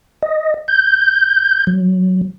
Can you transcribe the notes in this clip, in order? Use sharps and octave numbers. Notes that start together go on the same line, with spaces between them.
D#5
G6
F#3